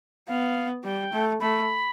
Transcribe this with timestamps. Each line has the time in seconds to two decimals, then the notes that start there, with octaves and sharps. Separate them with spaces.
0.28 B3 F5
0.84 G3 G5
1.13 A3
1.40 A3 B5